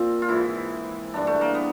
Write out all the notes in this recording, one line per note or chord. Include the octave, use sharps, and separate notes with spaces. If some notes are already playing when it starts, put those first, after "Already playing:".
Already playing: A#2 F3 C4
F4
G#2 E3 E4
G2 E3 D4
A3
A#3
B3